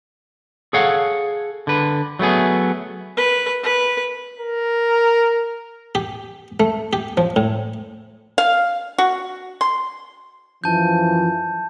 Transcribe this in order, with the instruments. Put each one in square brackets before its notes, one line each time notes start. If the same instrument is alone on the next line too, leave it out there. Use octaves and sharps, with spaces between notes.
[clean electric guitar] G#4 A4 C#5 F5 F#5
D3 B4
F#3 A3 B3 G#4
[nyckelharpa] B4
B4
[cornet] A#4
[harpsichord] G4
A3
G4
F3
A2
[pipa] F5
F#4
C6
[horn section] F#2 E3 F3 [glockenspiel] A5 G6